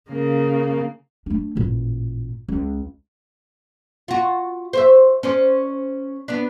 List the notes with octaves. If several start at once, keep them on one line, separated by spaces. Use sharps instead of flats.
C#3 A#3
A3 D4
A1 A#2
C#2
F4 F#4
C5 C#5 E5
C#4 C5 D5
B3 D4